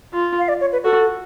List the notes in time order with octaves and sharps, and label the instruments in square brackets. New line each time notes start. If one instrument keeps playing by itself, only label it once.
[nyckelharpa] F4
[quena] F5
D5
C#5
B4
[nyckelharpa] F#4 [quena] A4